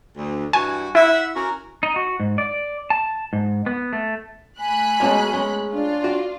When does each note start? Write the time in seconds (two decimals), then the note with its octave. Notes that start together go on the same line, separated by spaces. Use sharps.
0.17 D2
0.53 G2 E3 F#4 G#5
0.95 E4 E5 F#5
1.35 C#4 F#4 A#4
1.83 D#4
1.96 F#4
2.20 G#2
2.38 D5
2.90 A5
3.33 G#2
3.66 B3
3.93 A3
4.60 A3 G#5 B5 F#6
5.00 B2 G#3 A#3 C#4 F#4
5.33 G#3 C#4
5.72 D4 F4
6.04 F#4 D5